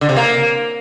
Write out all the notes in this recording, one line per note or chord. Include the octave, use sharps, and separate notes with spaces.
D3
C3
A#3